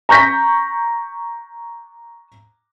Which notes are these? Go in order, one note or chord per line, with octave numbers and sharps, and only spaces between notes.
A#5 C#6 G6 A#6 B6